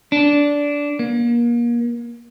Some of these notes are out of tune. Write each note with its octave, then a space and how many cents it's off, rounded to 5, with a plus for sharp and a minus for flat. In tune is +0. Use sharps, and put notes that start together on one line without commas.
D4 -15
A#3 +30